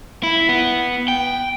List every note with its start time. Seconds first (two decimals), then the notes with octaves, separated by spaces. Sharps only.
0.23 E4
0.49 B3
1.08 G5